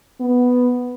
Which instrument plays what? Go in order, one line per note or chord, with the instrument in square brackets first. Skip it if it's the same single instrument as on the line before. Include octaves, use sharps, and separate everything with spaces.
[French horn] B3